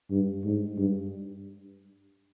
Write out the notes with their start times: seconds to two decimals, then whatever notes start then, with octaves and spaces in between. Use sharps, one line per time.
0.11 G2
0.44 G#2
0.78 G2